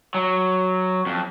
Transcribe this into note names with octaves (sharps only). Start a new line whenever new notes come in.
F#3
F2